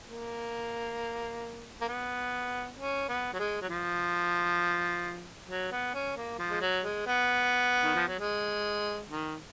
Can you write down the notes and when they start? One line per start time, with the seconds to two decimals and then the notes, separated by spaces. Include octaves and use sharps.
0.09 A#3
1.81 A#3
1.88 B3
2.79 C#4
3.09 B3
3.33 F#3
3.39 G#3
3.62 F#3
3.69 F3
5.48 F#3
5.72 B3
5.94 C#4
6.16 A#3
6.39 F3
6.51 G#3
6.61 F#3
6.84 G#3
7.07 B3
7.84 D#3
7.95 F3
8.08 F#3
8.20 G#3
9.09 D#3